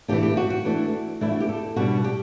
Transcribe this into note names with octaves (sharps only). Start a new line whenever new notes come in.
E3 A3 D4 G4
G4
F#4
F#4
E3 A3 D4
E3 A3 D4 E4
F#4
G4
A4
B2 G3 B3 D4 F#4
G4